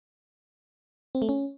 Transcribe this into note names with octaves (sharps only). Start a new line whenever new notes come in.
C4
A3
C#4